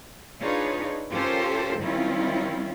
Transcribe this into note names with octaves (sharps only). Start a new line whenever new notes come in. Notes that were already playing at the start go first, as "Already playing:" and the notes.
D4 D#4 F4 G#4 B4 C#5
C#4 F4 G4 A4 A#4 C5
D#3 G3 C4 C#4 E4 F4